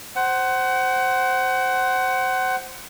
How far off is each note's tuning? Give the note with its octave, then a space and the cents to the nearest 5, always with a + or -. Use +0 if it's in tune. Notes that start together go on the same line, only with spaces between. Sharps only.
C5 +0 F#5 +25